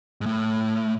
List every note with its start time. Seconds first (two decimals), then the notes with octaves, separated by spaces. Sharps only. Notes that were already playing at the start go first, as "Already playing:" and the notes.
0.21 G#2
0.26 A2